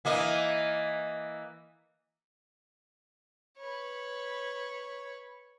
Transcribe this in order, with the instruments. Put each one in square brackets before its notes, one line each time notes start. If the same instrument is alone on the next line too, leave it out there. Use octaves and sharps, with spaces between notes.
[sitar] E3 A#3 D#5
[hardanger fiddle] B4 C#5